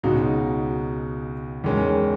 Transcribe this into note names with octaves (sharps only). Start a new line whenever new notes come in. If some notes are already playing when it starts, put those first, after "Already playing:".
C#2 B2 G#3 D#4 F#4
E2 D#3 G#3 C#4